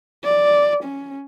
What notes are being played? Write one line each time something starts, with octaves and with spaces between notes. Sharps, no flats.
D5
C#4